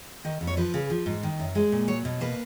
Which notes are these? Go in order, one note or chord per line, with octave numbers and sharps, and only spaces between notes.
D#3 D#5
F2
C#5
F3 B4
C#3
F3
G#2
D#3
F#2
G#3
A#2
F#3 C#5
B2
A#3 B4